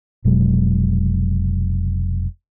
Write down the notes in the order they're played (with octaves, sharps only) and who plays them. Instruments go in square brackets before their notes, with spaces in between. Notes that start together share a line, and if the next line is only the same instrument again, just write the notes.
[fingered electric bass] F1 B2 F#3 G#3